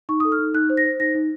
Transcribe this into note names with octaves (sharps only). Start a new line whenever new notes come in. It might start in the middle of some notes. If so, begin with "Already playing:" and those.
D#4 C#6
D#6
A4
F6
D#4
D#4 F#6
C5
A#6
C5
D#4 A#6
D#4